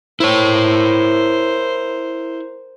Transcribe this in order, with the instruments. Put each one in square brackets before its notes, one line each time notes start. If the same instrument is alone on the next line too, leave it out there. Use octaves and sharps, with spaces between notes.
[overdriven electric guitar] E4 C#5 [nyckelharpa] A#4 C5